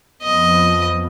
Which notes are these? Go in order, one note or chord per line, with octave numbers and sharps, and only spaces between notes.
F2 F3 B3 D#5